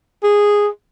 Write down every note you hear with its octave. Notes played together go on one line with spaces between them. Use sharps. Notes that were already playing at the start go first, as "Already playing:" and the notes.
G#4